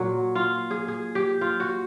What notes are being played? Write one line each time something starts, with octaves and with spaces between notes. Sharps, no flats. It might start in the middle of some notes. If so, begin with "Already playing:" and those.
Already playing: A#2 F#3 F#4
F4
G#4
G#4
G4
F4
F#4